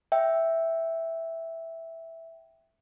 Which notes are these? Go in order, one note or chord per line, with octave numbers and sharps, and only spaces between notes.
E5 G5